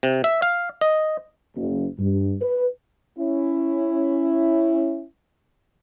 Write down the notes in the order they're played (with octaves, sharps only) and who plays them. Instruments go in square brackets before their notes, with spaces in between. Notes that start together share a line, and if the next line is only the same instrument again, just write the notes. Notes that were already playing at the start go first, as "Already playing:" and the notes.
[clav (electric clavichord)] C3
E5
F5
D#5
[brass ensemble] F#1
G2
B4
[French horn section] C#4 E4